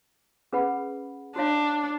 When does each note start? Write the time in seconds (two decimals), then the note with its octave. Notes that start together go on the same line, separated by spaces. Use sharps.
0.53 C#4 G#4 B4 F#5 B5
1.36 D4 F#4 C#5 F5